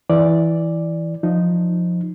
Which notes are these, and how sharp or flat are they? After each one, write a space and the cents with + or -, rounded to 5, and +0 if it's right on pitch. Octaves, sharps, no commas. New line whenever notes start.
E3 -5 D5 +0
F3 +10 D#4 +0